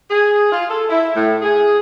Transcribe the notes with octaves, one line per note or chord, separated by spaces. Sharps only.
G#4
F4
A4
E4
A2
G#4